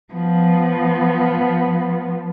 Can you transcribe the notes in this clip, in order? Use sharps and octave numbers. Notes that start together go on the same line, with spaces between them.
F3 B3